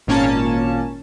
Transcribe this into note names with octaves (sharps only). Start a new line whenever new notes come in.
G#1 A#2 A#3 C#4 C#5 A5